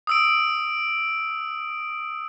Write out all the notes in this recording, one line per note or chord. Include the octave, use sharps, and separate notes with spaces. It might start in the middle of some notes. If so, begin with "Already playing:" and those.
D#6 E6 D7